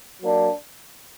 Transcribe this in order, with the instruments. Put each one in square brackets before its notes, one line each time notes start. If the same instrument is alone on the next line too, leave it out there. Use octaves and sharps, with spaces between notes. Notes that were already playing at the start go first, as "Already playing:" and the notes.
[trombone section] F#3 A#3 D4